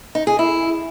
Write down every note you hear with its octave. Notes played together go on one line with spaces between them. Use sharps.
D#4
G#4
E4